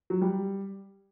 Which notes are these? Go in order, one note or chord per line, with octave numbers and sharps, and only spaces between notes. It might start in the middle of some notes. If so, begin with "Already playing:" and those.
F#3
G3